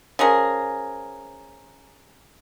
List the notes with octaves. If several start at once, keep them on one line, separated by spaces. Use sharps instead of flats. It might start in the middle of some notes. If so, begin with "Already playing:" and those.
F3 C#4 G#4 A#4